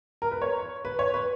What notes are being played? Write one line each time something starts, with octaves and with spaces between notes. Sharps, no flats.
A#4
B4
C#5
B4
C#5
B4